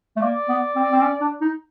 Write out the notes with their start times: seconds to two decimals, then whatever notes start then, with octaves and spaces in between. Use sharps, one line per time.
0.17 A3
0.21 A#3 D5
0.49 B3
0.76 C4
0.92 C4
1.02 C#4
1.21 D4
1.41 D#4